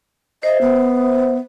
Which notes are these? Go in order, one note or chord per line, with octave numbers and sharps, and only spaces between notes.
C5 D#5 E5
B3